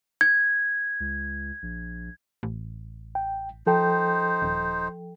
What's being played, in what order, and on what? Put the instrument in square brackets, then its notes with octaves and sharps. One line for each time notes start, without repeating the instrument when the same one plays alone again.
[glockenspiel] G#6
[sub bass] C#2
A#1
[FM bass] A1
[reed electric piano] G5
[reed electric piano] F3 A4 G5 [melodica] D#4 C5
[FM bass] D#1